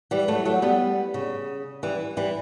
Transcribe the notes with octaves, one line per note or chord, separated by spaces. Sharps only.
E3 G3
F#3 A3
F#3 A3
G3 B3
C#3
E3 G3
E3 G3